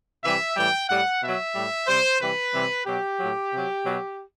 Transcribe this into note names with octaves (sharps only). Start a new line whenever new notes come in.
C3 E3 G3 E5
A2 E3 G3 G5
A2 G3 F#5
B2 F#3 E5
A2 G3
C3 G3 C5
C3 E3 G3 B4
C3 E3 G3
B2 F#3 G4
A2 F#3
C3 F#3
B2 F#3